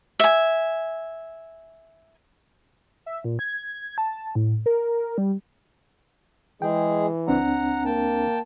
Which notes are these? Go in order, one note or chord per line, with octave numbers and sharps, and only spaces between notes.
E5 G#5
E5
A#2
G#6
A5
A2
A#4
G3
E3 G#3 G#4 G5
C#2 C4 D4 F#5 A#5
A#3 G5 A5